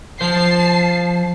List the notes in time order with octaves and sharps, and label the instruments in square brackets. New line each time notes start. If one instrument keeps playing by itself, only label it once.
[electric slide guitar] F3 C5 [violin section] A5 C7